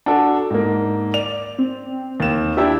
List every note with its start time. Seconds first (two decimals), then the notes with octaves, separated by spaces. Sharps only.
0.06 D4 F#4 A4
0.50 G#2 A#3
1.14 D5 F7
1.59 C4
2.20 D#2 E7
2.57 D4 E4 G4 E6